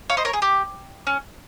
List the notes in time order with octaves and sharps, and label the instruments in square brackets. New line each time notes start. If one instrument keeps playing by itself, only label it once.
[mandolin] C#5 F5
C5 D#5
A#4 C#5
G#4
G4
C#4